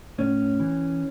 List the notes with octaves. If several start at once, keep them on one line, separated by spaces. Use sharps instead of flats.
A2 C#4
E3